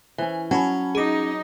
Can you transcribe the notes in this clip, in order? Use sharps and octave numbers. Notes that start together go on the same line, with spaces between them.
E3 C#4 C5
F#3 C#4 C#5 G#5 A5 B5
D#4 G#4 D6